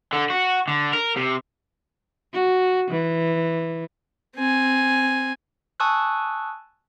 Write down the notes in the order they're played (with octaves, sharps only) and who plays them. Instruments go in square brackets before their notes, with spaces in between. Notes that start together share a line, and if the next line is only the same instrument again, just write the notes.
[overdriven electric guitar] D3
F#4
D3
A#4
C3
[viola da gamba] F#4
E3
[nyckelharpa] C4 G#5
[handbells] G#5 A5 C#6 D#6 E6 F#6